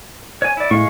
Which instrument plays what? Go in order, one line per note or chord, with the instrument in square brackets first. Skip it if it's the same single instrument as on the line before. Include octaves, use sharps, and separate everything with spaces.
[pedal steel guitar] C#5 G#5
E4 D5
[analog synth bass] A2 [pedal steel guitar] G#3 F5 C#6